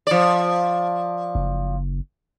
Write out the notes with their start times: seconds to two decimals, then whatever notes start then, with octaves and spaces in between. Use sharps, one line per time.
0.07 F3 D5
1.35 F#1